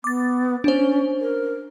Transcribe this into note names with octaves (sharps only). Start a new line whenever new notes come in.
B3 D6 A6
C#4 D4 C5
A#4